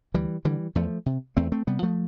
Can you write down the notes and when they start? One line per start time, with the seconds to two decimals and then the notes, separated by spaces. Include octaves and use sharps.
0.14 D2 E3 G3
0.45 D3 E3 G3
0.75 E2 F3 A3
1.06 C3
1.37 E2 A3 C4
1.52 A3 C4
1.67 C3 G3 B3
1.82 F3 A3